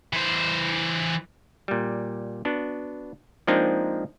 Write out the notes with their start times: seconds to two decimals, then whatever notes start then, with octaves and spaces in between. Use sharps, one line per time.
0.13 E3 C5
1.68 A#2 G3
2.45 B3 D4 F#4
3.47 F3 G#3 A#3 C4 D4 D#4